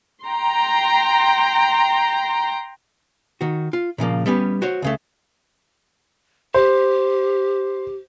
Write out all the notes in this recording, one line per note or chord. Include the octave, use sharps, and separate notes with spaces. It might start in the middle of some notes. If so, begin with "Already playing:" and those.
G5 A#5 C6
D#3 F#4
F4
A#2 C#3 F3 A#3
G3 B3 C#4 G4
F#4 C5 C#5
C#2 C#3 A3
G4 C5